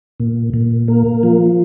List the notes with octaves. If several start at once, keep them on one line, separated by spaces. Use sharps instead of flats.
A#2
A#2
A#3
F3